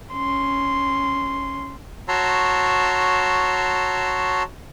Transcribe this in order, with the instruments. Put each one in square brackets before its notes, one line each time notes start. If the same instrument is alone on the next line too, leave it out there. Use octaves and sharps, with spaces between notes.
[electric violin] C#4 C6
[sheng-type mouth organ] F#4 C#5 A5 A#5 C6 E6